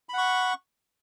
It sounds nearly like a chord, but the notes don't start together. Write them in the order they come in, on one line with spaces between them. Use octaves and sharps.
B5 F#5 C#6